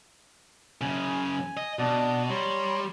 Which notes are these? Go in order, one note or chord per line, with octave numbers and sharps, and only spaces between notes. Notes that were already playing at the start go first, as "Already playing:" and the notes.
F#2 C#3 G#5
D#5
B2 D4 D5 D#5
G3 C#5 A#5 C6